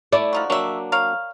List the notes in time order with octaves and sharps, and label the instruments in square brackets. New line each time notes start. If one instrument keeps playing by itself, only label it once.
[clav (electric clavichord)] A3 E4 [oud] D5
[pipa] F3 D#4 F#4
[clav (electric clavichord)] F#3 A#3 D4 [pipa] C#5 E5
[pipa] A#4 C#5 F5